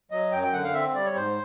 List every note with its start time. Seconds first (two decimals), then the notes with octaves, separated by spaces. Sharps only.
0.11 F#3 D#5
0.32 F#2 G5
0.43 G5
0.53 D3 F#5
0.64 F5
0.74 C4 E5
0.95 G3 D5
1.06 C#5
1.16 G#2 C5